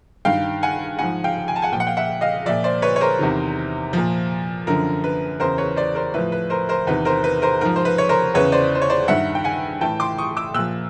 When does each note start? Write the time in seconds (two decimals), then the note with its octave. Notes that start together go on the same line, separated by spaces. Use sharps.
0.25 G2 D#3 F5 G5
0.63 F#5 G#5
0.99 G#2 F3 F#5 G#5
1.24 F5 G5
1.48 G#5
1.56 A5
1.62 F#5 G#5
1.72 A#2 G5
1.75 F3 F#5
1.87 F5 G5
1.97 E5 F#5
2.21 D#5 F5
2.46 A#2 F3 D5 E5
2.64 C5 D5
2.82 B4 C#5
2.96 C#5
3.01 A#4 C5
3.19 E2 C3 D#3
3.93 A#2 F3
4.67 F#2 D3 F3 A#4
5.04 B4
5.40 E2 C#3 E3 A#4 C5
5.58 B4 C#5
5.76 C5 D5
5.95 A#4 C5
6.14 A2 F3 B4
6.32 B4
6.50 A#4 C5
6.69 A#4 C5
6.87 E2 C3 D#3 B4
7.05 A#4 C5
7.24 B4
7.42 A#4 C5
7.61 G#2 F3 A#4
7.76 C5
7.85 B4
7.98 C#5
8.09 A#4 C5
8.34 E2 C#3 E3 B4 C#5
8.52 C5 D5
8.75 C5
8.82 C#5
8.90 C5 D5
9.08 G2 D#3 E5 F#5
9.35 G5
9.44 F#5 G#5
9.81 A2 E3 G5 A5
10.00 C6 D6
10.18 C#6 D#6
10.37 D6 E6
10.54 A#2 F3 E6 F#6